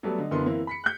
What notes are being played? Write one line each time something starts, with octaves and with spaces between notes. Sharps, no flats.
F#3 G3 A3 B3 A4 D5
D3 D#5
F#2 D3 E3 A#3 B3 C6
E3 A#3 C4 E4
B5 B6 C#7
F#6 G6